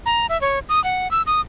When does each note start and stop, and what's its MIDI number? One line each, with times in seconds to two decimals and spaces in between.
0.06 0.26 82
0.29 0.40 76
0.41 0.59 73
0.69 0.82 87
0.84 1.10 78
1.11 1.22 88
1.27 1.41 87